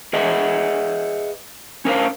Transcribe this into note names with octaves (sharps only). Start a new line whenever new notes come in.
G#4 B4 D#5 E5 F#5
C#4 A#4 C5 F5